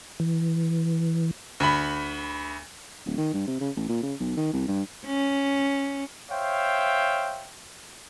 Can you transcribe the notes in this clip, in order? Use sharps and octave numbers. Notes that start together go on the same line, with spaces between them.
E3
D2 B5
D1
D#3
G2
C3
C#3
A1
A#2
C#3
B1
D#3
C2
G2
C#4
C5 C#5 E5 F5 G5